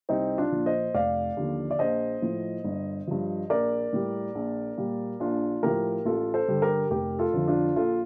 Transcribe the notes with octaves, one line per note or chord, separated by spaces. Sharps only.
C2 C4 D#4
D4 F4
A#2 F3
C5 D#5
F1 D5 F5
D#2 D3 F3
D5
A#1 C5 D#5
A2 F3
G1
G2 F3
A#1 A#4 D5
A2 G3
A#1
A#2 G3
A#1 D4 F4
A2 F3 G4 A#4
A1 F4 A4
A4 C5
G2 D3 G3
G4 A#4
F1 G4 A#4
F4 A4
F2 D3 F3
D4 F4
A#1 F4 A4